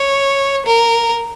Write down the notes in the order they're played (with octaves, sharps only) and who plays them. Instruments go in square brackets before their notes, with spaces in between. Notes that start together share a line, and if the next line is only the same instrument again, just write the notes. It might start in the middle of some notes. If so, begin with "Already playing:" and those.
Already playing: [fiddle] C#5
A#4